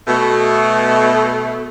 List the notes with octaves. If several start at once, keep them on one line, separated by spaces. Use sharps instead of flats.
B2 A3